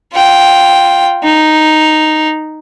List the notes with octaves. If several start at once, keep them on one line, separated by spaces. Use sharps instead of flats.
F4 G5
D#4